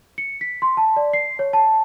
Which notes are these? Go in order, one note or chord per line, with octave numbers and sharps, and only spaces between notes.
C#7
B6
C6
A5
D5
C7
C#5
A5